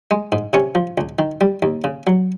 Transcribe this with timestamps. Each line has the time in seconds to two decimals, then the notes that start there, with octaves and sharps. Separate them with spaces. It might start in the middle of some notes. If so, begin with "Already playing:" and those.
0.11 G#3
0.32 G#2
0.53 C3 C#4 C#5
0.75 F3
0.98 C#2
1.19 D#3
1.41 G3
1.62 D#2
1.84 C#3
2.07 F#3